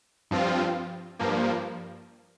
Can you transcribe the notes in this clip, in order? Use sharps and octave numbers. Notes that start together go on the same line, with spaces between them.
G2 F3 C4 F4
G2 F3 A#3